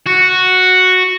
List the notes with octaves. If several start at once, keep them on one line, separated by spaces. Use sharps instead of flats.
F#4